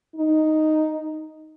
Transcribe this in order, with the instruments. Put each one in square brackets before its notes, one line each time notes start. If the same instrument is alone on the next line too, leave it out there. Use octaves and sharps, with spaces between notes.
[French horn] D#4